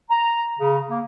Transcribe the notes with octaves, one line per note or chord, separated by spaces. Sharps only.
A#5
C#3
A#3